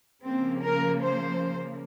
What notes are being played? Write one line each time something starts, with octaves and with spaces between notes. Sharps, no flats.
C#3 F3 A#3 C4
A#4
C5